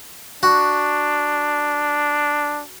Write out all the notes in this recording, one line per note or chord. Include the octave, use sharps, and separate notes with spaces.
D4 F#4